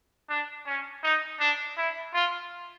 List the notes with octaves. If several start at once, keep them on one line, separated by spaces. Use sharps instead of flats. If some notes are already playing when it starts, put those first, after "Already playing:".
D4
C#4
D#4
D4
E4
F4